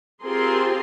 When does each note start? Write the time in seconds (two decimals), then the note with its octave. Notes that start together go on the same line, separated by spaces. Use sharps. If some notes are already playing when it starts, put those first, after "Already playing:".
0.21 C4 F4 G4 G#4 A#4 C6